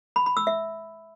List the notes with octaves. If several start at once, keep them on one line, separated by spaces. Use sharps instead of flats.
B5
B5
E6
E5